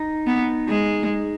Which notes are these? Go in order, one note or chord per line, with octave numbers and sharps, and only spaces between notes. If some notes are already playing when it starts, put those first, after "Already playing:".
Already playing: D#4
B3
G#3